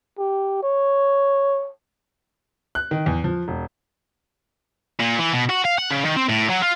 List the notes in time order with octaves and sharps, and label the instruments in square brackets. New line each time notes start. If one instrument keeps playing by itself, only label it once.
[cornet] G4
C#5
[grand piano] F#6
D#3
E2
F3
E1
[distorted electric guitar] A#2
E3
B2
F#4
F5
F#5
C#3
D#3
C4
A2
F#3
F4